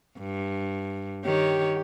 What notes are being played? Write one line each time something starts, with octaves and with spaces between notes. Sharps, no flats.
G2
D#3 G4 C#5